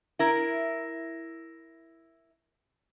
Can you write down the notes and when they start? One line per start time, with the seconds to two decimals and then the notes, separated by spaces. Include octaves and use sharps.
0.19 E4 A#4